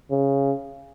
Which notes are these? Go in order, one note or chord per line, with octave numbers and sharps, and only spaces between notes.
C#3